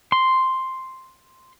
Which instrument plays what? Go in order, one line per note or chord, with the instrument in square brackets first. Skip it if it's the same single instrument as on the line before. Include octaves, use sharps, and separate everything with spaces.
[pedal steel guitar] C6